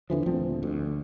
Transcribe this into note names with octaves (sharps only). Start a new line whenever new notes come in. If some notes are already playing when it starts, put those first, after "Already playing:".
E2 D3 E3 F3
D#1 D2 F3 C4
D2